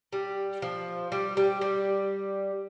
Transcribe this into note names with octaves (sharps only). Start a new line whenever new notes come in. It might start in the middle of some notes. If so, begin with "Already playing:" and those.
G3
F3
G3
G3
G3